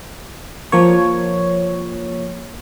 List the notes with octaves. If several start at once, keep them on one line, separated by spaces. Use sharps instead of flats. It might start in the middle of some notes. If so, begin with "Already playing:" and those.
F3 A#3 C#5